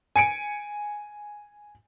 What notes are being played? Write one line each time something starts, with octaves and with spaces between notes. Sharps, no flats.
G#5 C#7 D7